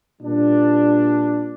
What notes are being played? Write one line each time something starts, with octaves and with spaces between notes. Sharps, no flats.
A#2 G3 D4